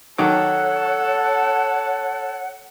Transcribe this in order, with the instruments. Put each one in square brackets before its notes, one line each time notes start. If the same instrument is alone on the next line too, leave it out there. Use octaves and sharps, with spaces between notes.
[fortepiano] D#3 F#3 D6 [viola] A4 A5 [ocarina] C#5 [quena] F#5